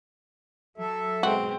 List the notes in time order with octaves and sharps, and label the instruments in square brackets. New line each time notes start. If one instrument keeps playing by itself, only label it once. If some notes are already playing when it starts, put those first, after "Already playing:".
[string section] F#3 [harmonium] A4 E5
[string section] B2 G#3 [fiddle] C4 [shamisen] F#4